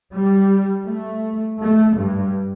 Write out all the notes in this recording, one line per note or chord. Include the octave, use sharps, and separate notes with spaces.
G3
A3
A3
G2